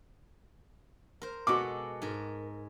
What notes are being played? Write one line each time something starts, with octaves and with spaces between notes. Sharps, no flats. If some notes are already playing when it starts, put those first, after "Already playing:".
A#4 C5
B2 G#3 F#4 A4 D6
G#2 A#4